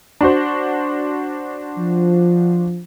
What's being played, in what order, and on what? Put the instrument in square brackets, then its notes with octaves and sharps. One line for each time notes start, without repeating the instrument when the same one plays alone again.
[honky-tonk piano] D4 F#4 C5
[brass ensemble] F3